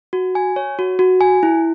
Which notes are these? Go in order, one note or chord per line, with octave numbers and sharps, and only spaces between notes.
F#4
G#5
C#5
F#4
F#4
G#5
E4